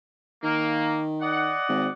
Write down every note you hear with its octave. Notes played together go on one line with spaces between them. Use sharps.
D#3 A#3
D5 D#5 F#5
G#1